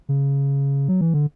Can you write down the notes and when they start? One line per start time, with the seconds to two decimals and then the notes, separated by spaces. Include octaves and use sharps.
0.09 C#3
0.88 F#3
1.01 E3
1.14 D3